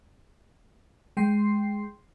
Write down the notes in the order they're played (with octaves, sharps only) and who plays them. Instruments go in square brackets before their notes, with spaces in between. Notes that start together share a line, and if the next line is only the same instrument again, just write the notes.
[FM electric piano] G#3 G5 C6 C7